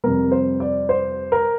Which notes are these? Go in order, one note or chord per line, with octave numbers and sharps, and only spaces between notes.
F2 C3 G3 A#4
C5
D5
C5
A#4